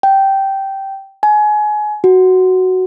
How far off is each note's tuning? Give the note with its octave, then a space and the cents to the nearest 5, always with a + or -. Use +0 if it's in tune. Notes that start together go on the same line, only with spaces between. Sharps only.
G5 -10
G#5 +25
F#4 +5